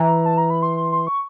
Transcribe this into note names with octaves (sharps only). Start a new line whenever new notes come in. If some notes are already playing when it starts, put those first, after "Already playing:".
Already playing: E3 A#5
A5
A#5
B5
C6
C6
C6
C#6